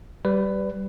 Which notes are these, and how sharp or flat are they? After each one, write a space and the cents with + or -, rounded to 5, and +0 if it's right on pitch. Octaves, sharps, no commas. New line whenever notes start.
G3 -10 B4 +15